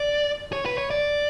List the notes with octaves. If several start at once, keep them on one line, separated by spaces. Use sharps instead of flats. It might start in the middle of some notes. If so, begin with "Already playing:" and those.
Already playing: D5
C#5
B4
C#5
D5